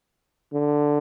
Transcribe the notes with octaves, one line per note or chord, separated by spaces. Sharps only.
D3